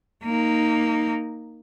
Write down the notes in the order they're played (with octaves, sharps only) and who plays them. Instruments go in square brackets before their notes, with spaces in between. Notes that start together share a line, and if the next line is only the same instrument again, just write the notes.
[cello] A#3 D#4